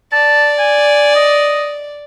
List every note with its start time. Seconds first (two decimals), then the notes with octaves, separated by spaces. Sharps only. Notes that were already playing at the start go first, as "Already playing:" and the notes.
0.12 D5 A5
0.58 G#5
1.15 D#5